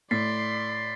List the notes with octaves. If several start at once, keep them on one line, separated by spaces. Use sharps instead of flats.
A2 D5 C6 A6 B6 C7